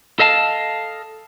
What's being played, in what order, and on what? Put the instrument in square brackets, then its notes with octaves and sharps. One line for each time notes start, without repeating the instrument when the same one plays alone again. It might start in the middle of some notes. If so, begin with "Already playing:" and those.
[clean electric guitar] A4 D#5 F5 A5